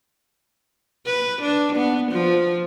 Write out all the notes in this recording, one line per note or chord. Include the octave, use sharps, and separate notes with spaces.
B4
D4
B3
F3